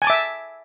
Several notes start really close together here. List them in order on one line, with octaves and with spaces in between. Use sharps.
G#5 A5 D6 E5